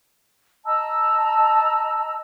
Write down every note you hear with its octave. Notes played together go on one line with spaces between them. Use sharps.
D#5 A5 A#5 E6